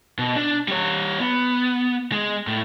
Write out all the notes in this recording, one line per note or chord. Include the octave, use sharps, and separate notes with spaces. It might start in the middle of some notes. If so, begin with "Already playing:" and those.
B2
D4
G3 C#5
B3
G#3
A2